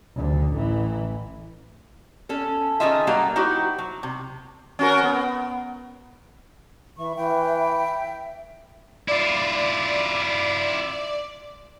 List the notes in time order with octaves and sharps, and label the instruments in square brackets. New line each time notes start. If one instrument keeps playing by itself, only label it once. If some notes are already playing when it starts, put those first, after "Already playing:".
[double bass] D2 D3
A1 E3
[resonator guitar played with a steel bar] C#4 A4
D#3 C#4 F4 G#4 D#5 E5
F#3 G3 A#3 F5 A#5
D#4 E4 F#4 G4 C5
F#3
C3
[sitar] C#4 F#4 A#4
B3
[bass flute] E3 [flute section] E5 C#6
[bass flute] E3 [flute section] E5 G5
[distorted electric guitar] E4 F4 [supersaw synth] D5